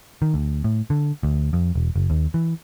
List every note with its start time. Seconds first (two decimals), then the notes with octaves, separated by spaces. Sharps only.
0.22 D#3
0.34 D2
0.64 A2
0.90 D3
1.23 D2
1.53 F2
1.75 E1
1.96 F#1
2.10 D#2
2.34 E3